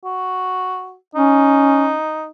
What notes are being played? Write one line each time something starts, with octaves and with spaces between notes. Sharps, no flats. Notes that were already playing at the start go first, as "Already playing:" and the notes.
F#4
C#4 D#4